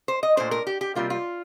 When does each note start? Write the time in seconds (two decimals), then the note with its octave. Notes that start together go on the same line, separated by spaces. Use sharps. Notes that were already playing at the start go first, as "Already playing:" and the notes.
0.08 C5
0.23 D#5
0.37 A#2 A3 D4 C5
0.51 A#4
0.67 G4
0.81 G4
0.95 C3 G3 A#3 F4
1.10 F4